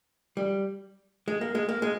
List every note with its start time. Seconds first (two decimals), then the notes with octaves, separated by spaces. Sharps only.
0.37 G3
1.28 G#3
1.41 A#3
1.55 G#3
1.69 A#3
1.82 G#3